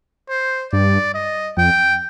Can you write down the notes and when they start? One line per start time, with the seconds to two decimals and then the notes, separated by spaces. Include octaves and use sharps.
0.29 C5
0.73 G2 D5
1.14 D#5
1.57 F2 G5